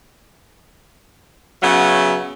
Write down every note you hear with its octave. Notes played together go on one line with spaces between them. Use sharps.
C#3 F#3 B3 E5